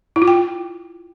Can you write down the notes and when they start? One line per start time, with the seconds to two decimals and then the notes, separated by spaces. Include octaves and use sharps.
0.16 E4
0.22 F4
0.28 G5